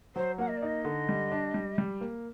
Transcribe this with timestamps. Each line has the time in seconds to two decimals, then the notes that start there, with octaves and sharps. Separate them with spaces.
0.16 F#3 C5
0.38 A#3 F#5
0.48 D#5
0.57 D5
0.62 D#4 D#5
0.85 D3
1.09 G3
1.32 D4
1.54 G3
1.78 G3
2.01 A#3